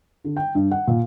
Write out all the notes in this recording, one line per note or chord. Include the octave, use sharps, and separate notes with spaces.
D3
G5
G2
F#5
A#2